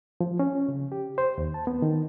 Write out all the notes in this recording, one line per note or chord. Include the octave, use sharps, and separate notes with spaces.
F3
C#4
C#3
G4
C5
D#2
A5
B3
D#3